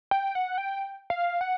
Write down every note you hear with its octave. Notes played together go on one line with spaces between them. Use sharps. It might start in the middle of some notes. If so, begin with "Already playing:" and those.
G5
F#5
G5
F5
F#5